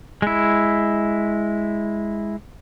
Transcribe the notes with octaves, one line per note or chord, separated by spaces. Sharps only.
G#3 E4